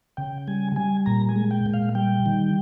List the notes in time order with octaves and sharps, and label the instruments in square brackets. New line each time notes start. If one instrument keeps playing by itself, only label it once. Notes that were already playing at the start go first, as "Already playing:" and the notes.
[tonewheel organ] C#3 G5
G3 G#5
G3 G#5
A#2 A#5
G#5
G#3
G5
A#2
F5
G3 G5
D#3